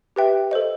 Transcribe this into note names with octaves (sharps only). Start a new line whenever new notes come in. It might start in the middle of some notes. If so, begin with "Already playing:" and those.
G4 B4 E5 G5
A4 C5 D#5